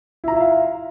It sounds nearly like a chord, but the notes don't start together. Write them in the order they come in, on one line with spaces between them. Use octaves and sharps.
E4 A#5 F4 E5 F5